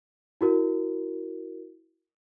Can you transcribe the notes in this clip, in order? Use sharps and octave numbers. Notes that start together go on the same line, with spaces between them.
E4 F#4 A#4